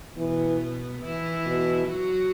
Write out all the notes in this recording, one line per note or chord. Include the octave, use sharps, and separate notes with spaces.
B2 E3 B3
E3 E4
B2
F#3 F#4